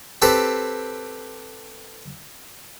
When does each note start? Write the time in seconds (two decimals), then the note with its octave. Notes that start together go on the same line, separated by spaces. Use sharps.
0.22 C4 G4 A4 B4